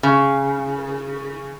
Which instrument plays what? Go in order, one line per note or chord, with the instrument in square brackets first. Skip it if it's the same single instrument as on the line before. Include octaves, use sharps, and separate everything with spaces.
[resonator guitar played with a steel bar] C#3